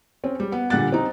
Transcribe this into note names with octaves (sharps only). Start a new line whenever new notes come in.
C4 C#4
G3
B3
A#2 D3 G3 F#5 F#6 A6
C4 D#4